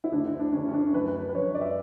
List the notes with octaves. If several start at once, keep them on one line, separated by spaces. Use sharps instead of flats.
E4
D2 D3 D4
E4
D4
D2 D3 C#4
C#4
D4
F#2 D3 B4
B4
B4
F#2 D3 C#5
D5
E5